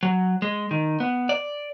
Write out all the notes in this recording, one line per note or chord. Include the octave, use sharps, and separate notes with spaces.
F#3
G#3
D#3
B3
D5